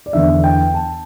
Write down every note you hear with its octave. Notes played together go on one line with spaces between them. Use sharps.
D5
E2 D3 B3 E5
G5
A5